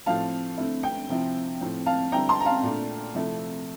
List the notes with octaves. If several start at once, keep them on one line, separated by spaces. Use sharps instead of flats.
A2 F3 A3 C4 F5 A5
D3 A3 C4 E4
G5
C3 F3 C4 E4
A2 F3 C4
F5 A5
D3 G3 C4 E4 G5 A#5
A5 C6
A#5
F5 A5
A#2 A3 D4
C3 F3 A3 E4